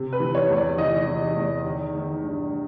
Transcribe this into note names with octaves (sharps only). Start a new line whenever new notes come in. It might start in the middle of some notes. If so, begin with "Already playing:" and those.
Already playing: C3
B4
E3
C#5
E2
D5
E3 D#5
E3
E2
D#3
D#3
G2